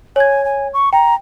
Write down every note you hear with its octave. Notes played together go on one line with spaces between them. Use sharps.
C#5 G#5 G#6
G#5
C#6
G5 A#5